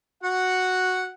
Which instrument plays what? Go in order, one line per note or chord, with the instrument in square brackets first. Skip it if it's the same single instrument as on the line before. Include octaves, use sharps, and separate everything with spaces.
[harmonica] F#4 F#5